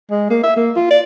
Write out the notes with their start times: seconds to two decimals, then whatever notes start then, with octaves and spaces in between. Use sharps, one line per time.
0.10 G#3
0.30 A#3
0.43 E5
0.57 A#3
0.76 F4
0.91 D5